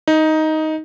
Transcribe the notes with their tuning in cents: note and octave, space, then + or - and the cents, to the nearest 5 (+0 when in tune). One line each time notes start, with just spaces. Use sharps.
D#4 +10